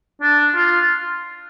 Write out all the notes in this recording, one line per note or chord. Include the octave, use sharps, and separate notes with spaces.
D4
F4